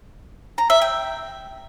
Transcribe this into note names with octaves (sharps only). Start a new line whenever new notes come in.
A#5
E5
G5